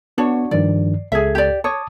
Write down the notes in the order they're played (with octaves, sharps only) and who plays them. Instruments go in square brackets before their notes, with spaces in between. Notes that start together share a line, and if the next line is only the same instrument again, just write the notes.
[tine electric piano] B3 [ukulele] D4 F#4 C#5
[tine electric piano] G2 D#3 F3 [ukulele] D5
[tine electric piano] C#2 A4 G#6 [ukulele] G#4 E5
[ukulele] G4 D5
[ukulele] C#5 [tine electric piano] A5 D6 D#6